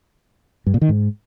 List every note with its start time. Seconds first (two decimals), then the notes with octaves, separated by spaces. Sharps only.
0.67 G2
0.74 A#2
0.81 D#3
0.89 G#2